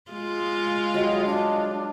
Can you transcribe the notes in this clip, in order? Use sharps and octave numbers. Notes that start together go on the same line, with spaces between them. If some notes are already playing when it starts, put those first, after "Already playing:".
G#3 F4
F#3 G3 G#4 D#5
D4